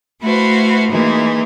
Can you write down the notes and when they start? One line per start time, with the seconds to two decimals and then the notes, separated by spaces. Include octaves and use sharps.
0.21 A3 E4 F#4 B4 C5 F5
0.90 E3 G#3 A#3 D#4 E4